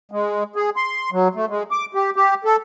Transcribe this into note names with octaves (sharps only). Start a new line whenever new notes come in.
G#3
G#4
C6
F#3
A3
G#3
D6
G4
G4
A4